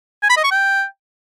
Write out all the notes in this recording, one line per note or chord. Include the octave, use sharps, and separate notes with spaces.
G#5
B5
D#5
C#6
G5